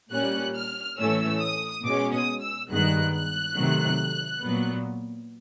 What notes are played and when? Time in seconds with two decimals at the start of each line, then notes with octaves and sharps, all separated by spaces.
0.11 A#2 G3 A#3 C#4 F#6
0.54 F6
0.98 A2 E3 A3 C#4 E6
1.40 D#6
1.84 B2 G#3 C#4 D6
2.13 D#6
2.41 E6
2.70 G2 D#3 G#3 B3 F#6
3.13 F#6
3.56 C3 D#3 F#3 A3
4.42 A#2 F#3 B3